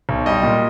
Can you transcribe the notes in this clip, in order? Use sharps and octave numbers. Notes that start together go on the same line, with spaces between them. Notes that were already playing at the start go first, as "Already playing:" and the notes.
B1
G3 D#5
A#2